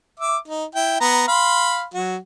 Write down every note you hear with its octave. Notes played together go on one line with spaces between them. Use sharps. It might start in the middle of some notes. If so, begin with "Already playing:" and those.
E5 D6
D#4
E4 G5
B3 A#5
F5 B5 C6
F#3 F#4